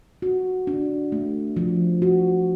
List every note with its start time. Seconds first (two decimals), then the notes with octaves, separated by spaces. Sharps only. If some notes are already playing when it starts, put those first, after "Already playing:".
0.22 F#4
0.67 D4
1.12 A3
1.57 F3
2.02 F#4